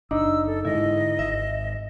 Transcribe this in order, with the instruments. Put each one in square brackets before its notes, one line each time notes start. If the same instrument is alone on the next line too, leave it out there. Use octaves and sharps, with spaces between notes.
[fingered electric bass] F#1 [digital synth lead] D4 [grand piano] D#4 [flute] E6
[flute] A4
[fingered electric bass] G#2 D3 G#3 [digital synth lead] E4 [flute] D#5
[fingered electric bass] G#1 [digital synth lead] E5